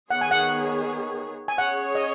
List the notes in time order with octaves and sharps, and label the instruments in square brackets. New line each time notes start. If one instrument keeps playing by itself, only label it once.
[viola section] D#3 B3 G#4 C#5 [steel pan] F#5
[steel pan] G#5
F#5
G#5
[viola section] C#4 G#4 C#5 [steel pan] F#5
[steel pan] D#5